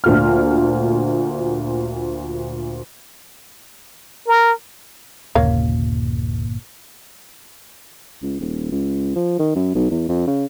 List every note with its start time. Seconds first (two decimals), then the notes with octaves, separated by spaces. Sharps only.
0.04 D2 A#2 F6
4.28 A#4
5.35 G1 D#2 A#2 C#3 A#3 C#5 F5
8.22 C#2
8.40 D#1
8.72 C#2
9.16 F3
9.39 D#3
9.55 F#2
9.75 B1
9.91 E2
10.09 F2
10.27 C#3